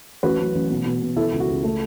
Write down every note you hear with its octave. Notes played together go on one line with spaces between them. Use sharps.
A1 F#4 B4
F#3
A1
B2
B2
B2
E3 E4 A4
C#2
F#4
C#2
A3